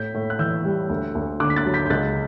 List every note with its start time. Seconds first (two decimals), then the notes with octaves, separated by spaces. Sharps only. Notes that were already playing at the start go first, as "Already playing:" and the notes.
Already playing: A2 G6 B6
0.14 A2
0.30 F#6
0.39 E3 E6 G6
0.65 G3
0.89 D2
1.15 D2
1.40 D3 D6 F#6
1.50 B6
1.56 F#6 A6
1.66 F#3
1.74 G6 B6
1.86 G6
1.90 C#2 F#6 A6